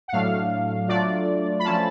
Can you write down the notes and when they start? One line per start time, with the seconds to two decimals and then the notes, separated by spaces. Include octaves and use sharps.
0.08 F#5
0.12 A2 F#3 A3 D4 F5
0.88 F#3 A3 D4 F4 D5
1.59 B5
1.64 F3 A3 C#4 F4 A5